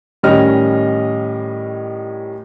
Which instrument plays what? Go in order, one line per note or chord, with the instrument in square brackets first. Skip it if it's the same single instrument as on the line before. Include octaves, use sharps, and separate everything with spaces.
[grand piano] A2 D#3 G3 C#4 D#5 F6